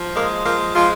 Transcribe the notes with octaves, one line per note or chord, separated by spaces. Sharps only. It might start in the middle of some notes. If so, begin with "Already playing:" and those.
Already playing: F3
G#3 A#3
F3 A#3
F3 G#3 F4